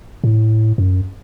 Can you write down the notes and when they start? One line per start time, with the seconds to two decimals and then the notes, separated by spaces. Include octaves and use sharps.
0.24 A2
0.78 F#2